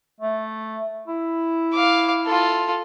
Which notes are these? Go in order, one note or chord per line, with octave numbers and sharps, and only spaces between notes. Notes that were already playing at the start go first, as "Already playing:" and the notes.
A3
E4
F5 D6
F4 A4